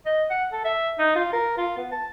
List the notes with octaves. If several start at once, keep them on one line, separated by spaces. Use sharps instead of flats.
D#5
F#5
A4
E5
D#4
F4
A#4
F4
B3
A5